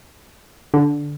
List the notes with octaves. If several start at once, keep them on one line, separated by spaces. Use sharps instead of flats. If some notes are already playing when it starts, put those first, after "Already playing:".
D3